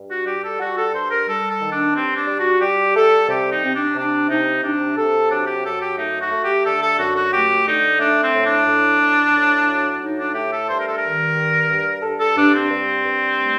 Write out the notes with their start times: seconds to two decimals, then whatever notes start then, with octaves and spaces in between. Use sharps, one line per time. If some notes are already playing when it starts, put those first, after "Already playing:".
Already playing: G2
0.10 F#4
0.26 G3 G4
0.43 A4
0.60 G3 F#4
0.77 A4
0.93 G2 C5
1.10 A#4
1.27 G3 A4
1.49 A4
1.60 D#3
1.71 D4
1.95 G2 C4
2.16 D4
2.28 G3
2.39 F#4
2.61 G3 G4
2.96 G3 A4
3.29 C3 G4
3.51 D#4
3.63 C3 C4
3.74 D4
3.96 C3 D4
4.29 C3 D#4
4.63 C3 D4
4.97 C3 A4
5.30 F#3 D4
5.47 G4
5.63 F#2 A4
5.81 G4
5.98 A3 D#4
6.20 F#4
6.32 A3
6.43 G4
6.65 D3 A4
6.81 A4
6.98 F#2 F#4
7.16 F#4
7.32 A3 G4
7.65 D3 D#4
7.99 A3 D4
8.22 C4
8.33 A2
8.45 D4
8.67 A2
9.01 A2
9.34 A2
9.67 F#3
10.01 A2 D#4
10.18 D4
10.35 A3 G4
10.52 A4
10.68 G2 C5
10.78 A#4
10.87 A4
10.97 A#4
11.02 D#3
11.35 G2
11.70 G2
12.02 G2 A4
12.19 A4
12.36 G2 D4
12.53 C4
12.71 G2
13.04 G2
13.38 A3